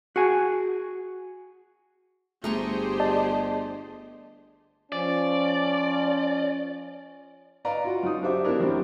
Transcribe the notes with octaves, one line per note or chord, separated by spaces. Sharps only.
F#4 G#4 G#5
G1 A3 G4 G#4 C5 A#5 C#6
D5 D#5 A5
F3 C#4 D5
B4 D5 D#5 F5 A#5
F4 F#4
F#2 D#4 D#6
D4 F#4 G4 C5 E5 D6
B3 C#4 D4 E4 G4 A#4
A1 F#2 C4 G4 C5